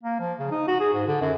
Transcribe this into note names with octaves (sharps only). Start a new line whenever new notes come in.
A#3
F3
C#3
D#4
F#4
G#4
G#2
D3
F#2